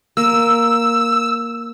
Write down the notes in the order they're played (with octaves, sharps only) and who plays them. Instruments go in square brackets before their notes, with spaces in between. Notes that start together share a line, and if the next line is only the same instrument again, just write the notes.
[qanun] A#3 [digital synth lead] E6